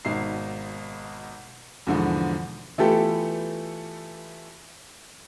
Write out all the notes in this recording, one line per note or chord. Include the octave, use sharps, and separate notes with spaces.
G#1 B2 D#4 C7
E2 G#2 B2 D3 E3 F3
E3 A3 B3 F4 G4 A4